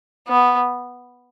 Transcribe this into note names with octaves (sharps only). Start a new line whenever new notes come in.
B3